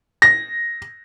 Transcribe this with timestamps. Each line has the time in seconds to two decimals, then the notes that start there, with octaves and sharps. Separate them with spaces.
0.22 A#6